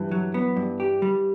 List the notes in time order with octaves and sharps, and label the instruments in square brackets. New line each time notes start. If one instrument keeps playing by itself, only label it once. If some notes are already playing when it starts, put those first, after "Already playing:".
Already playing: [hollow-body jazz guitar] G2 [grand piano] E3
[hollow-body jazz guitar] F#3
B3
G2
G4
G3